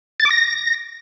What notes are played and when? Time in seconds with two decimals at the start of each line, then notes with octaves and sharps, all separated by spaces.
0.20 A6
0.25 D6
0.31 A#6